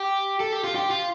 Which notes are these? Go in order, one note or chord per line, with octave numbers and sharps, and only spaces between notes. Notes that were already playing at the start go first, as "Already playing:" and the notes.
Already playing: G4
A4
G4
F4
G4
F4